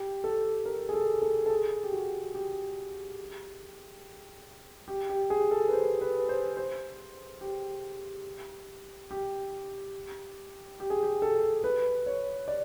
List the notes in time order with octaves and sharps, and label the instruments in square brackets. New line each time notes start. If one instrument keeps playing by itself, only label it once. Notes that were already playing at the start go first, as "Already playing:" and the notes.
Already playing: [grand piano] G4
A4
A#4
G#4
A4
A4
A4
G#4
G4
F#4
G4
G4
G4
G#4
A4
B4
C5
B4
C5
C5
G4
G4
G4
G#4
G4
A4
B4
C#5
D5